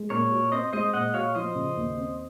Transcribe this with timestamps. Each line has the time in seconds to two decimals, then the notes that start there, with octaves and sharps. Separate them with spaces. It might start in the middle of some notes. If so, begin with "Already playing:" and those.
Already playing: G#3
0.10 A#2 A#4 C#5
0.32 F#4
0.52 C4 C5 D#5
0.73 G#3 C5 D#5
0.94 A#2 D#5 F#5
1.14 F#4 C#5 F5
1.35 F3 C5 D#5
1.55 C#3
1.77 D#2
1.97 C4